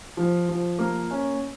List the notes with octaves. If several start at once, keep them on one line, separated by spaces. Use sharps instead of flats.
F3
F3
A#3
C#4